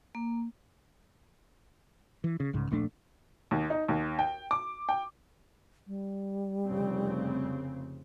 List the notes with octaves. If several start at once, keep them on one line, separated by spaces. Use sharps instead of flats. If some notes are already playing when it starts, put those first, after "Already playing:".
A#3
E3
C#3
C2 G#2 C#3
D#1 A#1 A3 D4
D#2
D#4
D#2
G5
D6
G5
G3
F1 C#3 C4